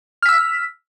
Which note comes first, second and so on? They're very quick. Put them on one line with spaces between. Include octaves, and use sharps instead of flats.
F6 B6 E6